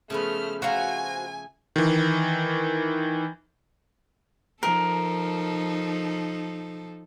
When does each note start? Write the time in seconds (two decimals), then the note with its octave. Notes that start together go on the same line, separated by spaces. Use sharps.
0.10 C#3 F3 A3 B3 F6
0.62 A3 F#4 C5 F5 G#5 A#5
1.76 D#3 E3
4.63 F3 D#4 A4 A#4